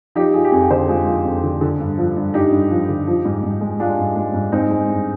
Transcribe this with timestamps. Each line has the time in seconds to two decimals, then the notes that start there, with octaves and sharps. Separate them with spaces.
0.15 F3 D#4 G4
0.34 F3 F4 G#4
0.44 G4
0.52 F2 F4 G#4
0.70 D3 G#4 C5
0.89 G#3 F4 G#4
1.07 F3
1.25 F2
1.43 D3
1.61 D3
1.80 G2
1.98 F3
2.17 G2
2.34 G2 D#4 G4
2.52 G2
2.71 F3
2.89 D3
3.07 F3
3.25 G#2
3.43 G#2
3.61 G#3
3.80 G#3 D4 F4
3.98 G#2
4.16 G#3
4.34 G#2
4.52 G#3 C4 D#4
4.71 G#3
4.90 G2